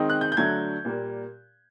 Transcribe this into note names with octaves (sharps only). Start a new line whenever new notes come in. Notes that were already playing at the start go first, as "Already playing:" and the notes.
Already playing: D#3 G#3 C4 D#4
F#6
G6
G6
D3 F#3 A3 G#6
A#2 G3 A#3